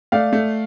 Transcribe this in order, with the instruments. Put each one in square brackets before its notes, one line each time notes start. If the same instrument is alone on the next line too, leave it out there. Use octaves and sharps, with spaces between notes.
[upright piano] A3 [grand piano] D5 F5
[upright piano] A3